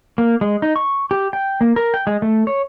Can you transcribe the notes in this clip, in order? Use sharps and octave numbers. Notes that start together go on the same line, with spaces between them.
A#3
G#3
D#4
C#6
G4
G5
A#3
A#4
G5
G#3
A3
C#5